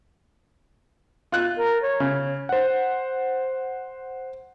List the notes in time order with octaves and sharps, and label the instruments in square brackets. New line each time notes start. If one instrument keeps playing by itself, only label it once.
[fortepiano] F4 F#6
[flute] A#4
C#5
[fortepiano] C#3
[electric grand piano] C5 F#5